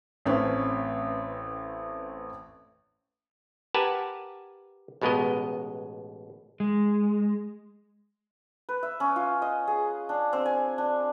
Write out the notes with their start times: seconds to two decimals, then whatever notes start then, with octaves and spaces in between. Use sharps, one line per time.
0.26 A1 A3 C4 C#4 B4
3.74 G4 A#4 B4 F#5 G#5 A5
5.02 A1 B2 G#3 B3 A#4 D#5
6.60 G#3
8.69 B4
8.83 E5
9.00 C#4
9.16 F4
9.42 D#5
9.67 G#4
10.09 D4
10.33 C4
10.46 G#5
10.78 D4